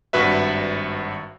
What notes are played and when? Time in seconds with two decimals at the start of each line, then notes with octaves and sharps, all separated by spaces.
0.13 G#1 G2 F#4 B4 E5